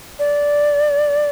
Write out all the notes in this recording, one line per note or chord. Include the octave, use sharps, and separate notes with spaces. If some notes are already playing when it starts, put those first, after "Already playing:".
D5